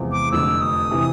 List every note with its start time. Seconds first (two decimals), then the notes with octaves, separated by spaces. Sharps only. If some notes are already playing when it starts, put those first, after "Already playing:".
Already playing: E2 C3 F3 G#3
0.12 D6
0.32 F1 F2 D3 E6
0.61 D#6
0.91 C3 E3